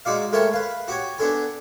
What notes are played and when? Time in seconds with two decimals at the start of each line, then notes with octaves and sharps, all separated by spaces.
0.05 G#3 D#4 F#4 D5 F5
0.32 G#3 A3 A#4 C#5 G5 A5
0.53 B4 F5
0.88 F#4 G4 C#5
1.18 B3 D4 A4 G#5